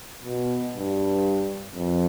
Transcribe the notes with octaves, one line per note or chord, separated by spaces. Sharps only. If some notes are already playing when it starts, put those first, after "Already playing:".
B2
G2
F2